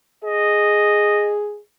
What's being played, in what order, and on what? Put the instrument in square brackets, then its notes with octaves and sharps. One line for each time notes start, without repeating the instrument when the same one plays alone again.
[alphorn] G#4 [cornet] D#5